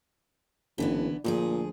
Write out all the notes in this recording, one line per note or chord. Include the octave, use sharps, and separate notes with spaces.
F#1 D3 E3 B3
D2 A#2 F3 G#4